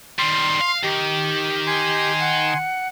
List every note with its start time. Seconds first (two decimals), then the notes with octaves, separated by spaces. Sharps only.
0.19 D#3 G3 C6
0.61 F5
0.83 D#3 G4
1.67 G#5 C6
2.19 F#5